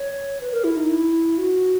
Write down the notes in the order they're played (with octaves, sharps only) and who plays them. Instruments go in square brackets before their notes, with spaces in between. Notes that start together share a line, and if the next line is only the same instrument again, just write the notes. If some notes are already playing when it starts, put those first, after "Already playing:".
Already playing: [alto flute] C#5
B4
A#4
E4
D#4
E4
F#4